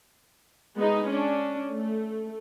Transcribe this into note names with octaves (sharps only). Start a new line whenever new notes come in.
G#3 B3 D#4 G#4
C#4 D4
A3